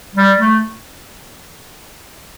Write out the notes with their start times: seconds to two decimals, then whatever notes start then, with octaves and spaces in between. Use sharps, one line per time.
0.15 G3
0.39 A3